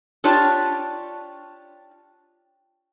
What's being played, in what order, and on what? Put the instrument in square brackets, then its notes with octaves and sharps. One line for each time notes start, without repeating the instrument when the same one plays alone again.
[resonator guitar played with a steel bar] D4 F4 G4 C#5 D5 A5